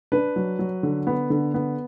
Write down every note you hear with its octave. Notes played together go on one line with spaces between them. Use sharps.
D4 B4
F#3
F#3
D3
B3
D3
B3